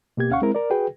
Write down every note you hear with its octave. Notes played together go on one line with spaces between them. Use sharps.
B2 A#3 G4 G#6
D2 C#4 F5 F#5 C#6
G#3 C4 E4 A#4
A#4 D5
F#4 G#4 B4 G5